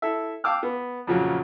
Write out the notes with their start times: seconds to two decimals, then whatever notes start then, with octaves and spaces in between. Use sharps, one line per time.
0.02 E4 A4 E5
0.44 F5 G5 A5 D6 E6 F6
0.63 B3
1.07 F2 A#2 C#3 F#3